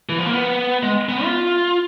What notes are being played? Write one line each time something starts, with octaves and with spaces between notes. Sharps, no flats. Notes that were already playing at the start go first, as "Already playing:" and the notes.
E3
F3
A#3
B3
G#3
B3
F4